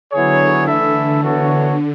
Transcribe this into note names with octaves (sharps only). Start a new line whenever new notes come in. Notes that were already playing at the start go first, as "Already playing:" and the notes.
D3 F#3 B3 E4 G#4 C#5
E3 A3 E4 A4 E5
E3 B3 F#4 A4 C#5